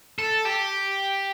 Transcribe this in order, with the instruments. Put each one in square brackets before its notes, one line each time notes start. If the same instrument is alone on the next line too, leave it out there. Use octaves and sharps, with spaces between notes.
[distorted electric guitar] A4
G4